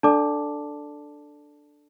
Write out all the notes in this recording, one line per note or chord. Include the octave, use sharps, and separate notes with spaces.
D4 A4 D5 A5 D6